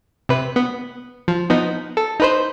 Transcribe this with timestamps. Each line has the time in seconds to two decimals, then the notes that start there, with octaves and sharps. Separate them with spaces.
0.29 C3 B4
0.56 B3
1.28 F3
1.49 F3 B3 D#4
1.97 A4
2.20 D#4 B4 C5